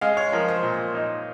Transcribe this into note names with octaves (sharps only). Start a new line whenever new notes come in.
G#3 F5
C#5
F3 A#4
C5
A#2
D#4